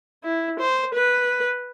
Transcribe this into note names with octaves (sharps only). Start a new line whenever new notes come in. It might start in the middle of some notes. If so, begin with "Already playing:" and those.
E4
C5
B4